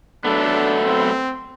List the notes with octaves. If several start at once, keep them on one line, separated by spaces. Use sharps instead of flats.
F#3 A3 B3 D4 A4
C4